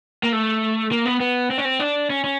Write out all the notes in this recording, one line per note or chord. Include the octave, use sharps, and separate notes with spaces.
A#3
A3
A#3
B3
B3
C4
C#4
C4
D4
C#4
C#4